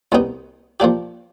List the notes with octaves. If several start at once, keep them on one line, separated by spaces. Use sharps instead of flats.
C2 B2 G3 B3 D#4
F3 A#3 D4 G4